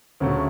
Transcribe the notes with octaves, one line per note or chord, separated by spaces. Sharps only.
D2 C#3 F#3 A3